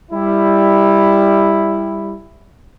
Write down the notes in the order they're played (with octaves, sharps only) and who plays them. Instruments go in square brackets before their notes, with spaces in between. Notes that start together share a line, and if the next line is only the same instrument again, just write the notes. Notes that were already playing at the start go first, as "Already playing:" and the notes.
[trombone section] G3 E4